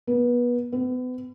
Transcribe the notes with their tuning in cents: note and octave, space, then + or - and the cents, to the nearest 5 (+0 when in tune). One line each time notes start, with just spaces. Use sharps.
B3 -25
B3 +35